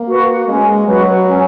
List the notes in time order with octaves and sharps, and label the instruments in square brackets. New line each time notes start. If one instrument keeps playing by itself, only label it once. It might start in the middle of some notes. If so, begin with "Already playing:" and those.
Already playing: [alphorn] A#3
[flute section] F#4 B4
[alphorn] G#3 [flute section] C#4
[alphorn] F#3 [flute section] F#4 B4
[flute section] C#4